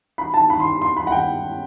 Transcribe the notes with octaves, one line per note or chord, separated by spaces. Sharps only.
B5
A5
B5
C6
C6
B5
F#5
G5